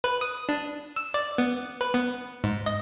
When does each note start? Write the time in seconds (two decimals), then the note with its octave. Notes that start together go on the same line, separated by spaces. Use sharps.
0.04 B4
0.21 D#6
0.49 D4
0.96 E6
1.14 D5
1.38 B3
1.81 B4
1.94 B3
2.44 G#2
2.66 D#5